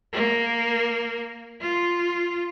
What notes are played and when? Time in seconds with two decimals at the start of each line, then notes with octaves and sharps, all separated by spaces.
0.13 A#3
1.61 F4